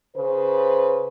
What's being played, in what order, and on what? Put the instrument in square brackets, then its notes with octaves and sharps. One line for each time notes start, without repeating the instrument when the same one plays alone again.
[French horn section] C#3 B4 C5